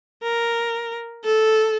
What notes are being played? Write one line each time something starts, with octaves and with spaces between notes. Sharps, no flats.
A#4
A4